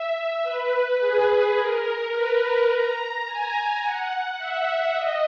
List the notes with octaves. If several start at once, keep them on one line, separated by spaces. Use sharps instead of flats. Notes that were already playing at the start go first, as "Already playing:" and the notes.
Already playing: E5
B4
G#4
A#4
B4
A#5
G#5
F#5
E5
D#5